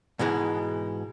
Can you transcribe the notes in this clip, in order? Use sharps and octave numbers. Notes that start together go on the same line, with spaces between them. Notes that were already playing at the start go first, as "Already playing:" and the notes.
G#2 B2 E3 G#3